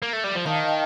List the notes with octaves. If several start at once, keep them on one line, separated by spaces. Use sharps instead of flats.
A#3
A3
G3
F3
D#3 F5 A5
D#5
F5
G5